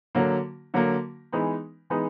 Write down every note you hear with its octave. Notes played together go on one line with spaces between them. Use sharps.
D3 F#3 A#3
D3 F#3 A#3
E3 G#3 B3 D#4
E3 G#3 B3 D#4